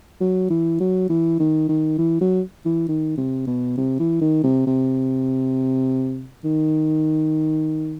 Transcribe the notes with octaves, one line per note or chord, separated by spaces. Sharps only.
F#3
E3
F#3
E3
D#3
D#3
E3
F#3
E3
D#3
C3
B2
C3
E3
D#3
C3
C3
D#3